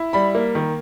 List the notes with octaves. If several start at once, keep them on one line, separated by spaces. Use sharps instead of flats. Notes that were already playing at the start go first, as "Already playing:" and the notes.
Already playing: E4
G3 B5
A#3
D#3